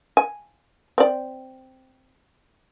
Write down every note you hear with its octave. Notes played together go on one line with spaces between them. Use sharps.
G#5
C4 D5